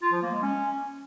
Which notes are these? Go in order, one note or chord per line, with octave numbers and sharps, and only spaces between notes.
F4
F3
A#3
G#3
C#4